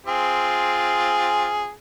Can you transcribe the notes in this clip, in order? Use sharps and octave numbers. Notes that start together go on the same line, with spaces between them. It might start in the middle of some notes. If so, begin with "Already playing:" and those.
C4 F4 G#4